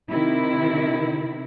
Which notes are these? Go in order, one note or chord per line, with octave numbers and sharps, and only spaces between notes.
C3 D#3 E4